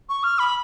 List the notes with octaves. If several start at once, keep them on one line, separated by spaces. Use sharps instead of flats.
C#6
F6
B5